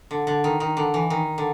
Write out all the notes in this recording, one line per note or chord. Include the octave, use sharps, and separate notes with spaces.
D3
D3
D#3
D#3
D3
E3
D#3
D3